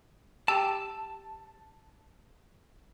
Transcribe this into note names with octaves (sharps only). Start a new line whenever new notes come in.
G4 G5 A5 E6